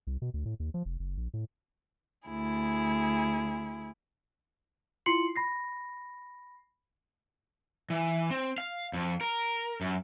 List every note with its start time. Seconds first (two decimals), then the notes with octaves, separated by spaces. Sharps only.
0.07 C2
0.22 B2
0.34 D2
0.46 A2
0.60 D#2
0.74 F3
0.85 F1
0.99 F#1
1.17 A#1
1.34 A2
2.29 D2 E4 G#4
5.06 E4 F4 C6 C7 C#7 F#7
5.36 B5 A#6 C7
7.90 E3
8.31 C4
8.58 F5
8.93 F2
9.21 A#4
9.81 F#2